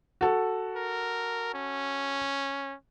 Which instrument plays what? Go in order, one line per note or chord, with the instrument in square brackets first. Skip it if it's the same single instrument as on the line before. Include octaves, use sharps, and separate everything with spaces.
[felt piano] F#4 A4
[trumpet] A#4
C#4